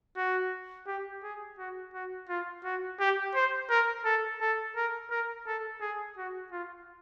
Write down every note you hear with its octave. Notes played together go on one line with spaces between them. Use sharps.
F#4
G4
G#4
F#4
F#4
F4
F#4
G4
C5
A#4
A4
A4
A#4
A#4
A4
G#4
F#4
F4